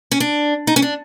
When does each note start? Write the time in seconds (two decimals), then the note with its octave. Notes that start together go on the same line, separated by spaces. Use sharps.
0.12 C#4
0.20 D4
0.67 D#4
0.76 C#4
0.82 D4